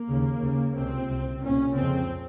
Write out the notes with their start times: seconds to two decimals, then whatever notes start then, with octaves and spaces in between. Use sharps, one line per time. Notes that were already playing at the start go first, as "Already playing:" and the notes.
Already playing: A#3
0.08 D#2 C#3
0.41 D#2 C#3
0.75 C#2 C3 C4
1.08 C2 C3
1.41 C2 A#2 C#4
1.74 F2 C#3 C4